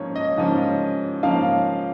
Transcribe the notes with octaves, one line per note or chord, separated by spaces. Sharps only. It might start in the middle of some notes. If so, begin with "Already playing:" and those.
Already playing: G#2 F3 A#3 C#4 C#5
D#5
G#2 F3 A#3 C#4
G#2 F3 A#3 C#4 F5